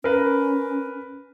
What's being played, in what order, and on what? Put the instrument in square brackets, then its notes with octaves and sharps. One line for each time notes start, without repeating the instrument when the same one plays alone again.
[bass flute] C#4 [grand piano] A#4 B4